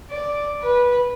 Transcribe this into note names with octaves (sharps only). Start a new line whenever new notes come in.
D5
B4